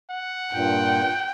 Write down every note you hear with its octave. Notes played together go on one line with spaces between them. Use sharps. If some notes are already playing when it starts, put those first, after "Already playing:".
F#5
G2 A#2 G5